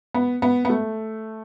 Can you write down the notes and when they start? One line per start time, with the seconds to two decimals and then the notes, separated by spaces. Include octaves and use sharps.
0.14 B3
0.42 B3
0.65 B3
0.69 A3